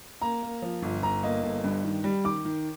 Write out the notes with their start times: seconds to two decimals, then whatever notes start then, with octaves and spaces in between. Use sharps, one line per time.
0.22 A#3 A#5
0.43 A#3
0.62 F3
0.82 G1
1.03 G1 A#5
1.23 A#3 D#5
1.43 G1
1.64 G2
1.84 D#3
2.04 G3
2.24 D#3 D6
2.45 D#3